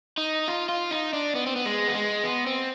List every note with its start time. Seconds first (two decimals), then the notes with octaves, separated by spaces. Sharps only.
0.18 D#4
0.48 F4
0.69 F4
0.91 D#4
1.13 D4
1.35 B3
1.46 C4
1.56 B3
1.65 G#3
1.88 B3
1.94 G#3
2.24 B3
2.47 C4